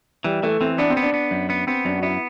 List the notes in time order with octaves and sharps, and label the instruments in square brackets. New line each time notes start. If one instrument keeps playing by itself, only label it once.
[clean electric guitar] E3 [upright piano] G3
[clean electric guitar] E3 [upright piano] A3
[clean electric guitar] E3 [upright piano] C4
[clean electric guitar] B3 [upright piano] D4
[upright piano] C4
[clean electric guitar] B3
[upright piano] D4
[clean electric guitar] B3
F#2
B3
[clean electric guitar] B3 [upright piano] C4
[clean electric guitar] F#2 [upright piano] D4
[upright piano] F#4
[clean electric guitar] B3 [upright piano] E4